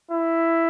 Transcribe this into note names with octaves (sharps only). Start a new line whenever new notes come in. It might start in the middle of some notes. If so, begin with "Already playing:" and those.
E4